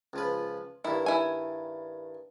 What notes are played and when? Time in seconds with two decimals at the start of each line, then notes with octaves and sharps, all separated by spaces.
0.13 C#2 F3 B4
0.85 G2 D#3 E4
1.06 E4 G#5